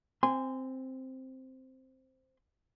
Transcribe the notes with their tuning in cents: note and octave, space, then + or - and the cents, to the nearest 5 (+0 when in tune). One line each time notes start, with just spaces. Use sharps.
C4 +0 G#5 -25 C6 -20